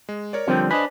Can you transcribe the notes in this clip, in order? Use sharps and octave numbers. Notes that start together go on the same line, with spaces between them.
G#3
A#4 C#5 D5
D3 F3 G3 C4
D4 B4 C5 D#5 G#5